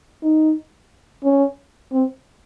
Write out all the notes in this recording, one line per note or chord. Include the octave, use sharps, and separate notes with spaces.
D#4
C#4
C4